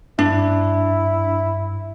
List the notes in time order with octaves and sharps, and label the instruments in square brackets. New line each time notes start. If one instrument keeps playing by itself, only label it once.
[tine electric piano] G2 [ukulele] D4 [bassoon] E4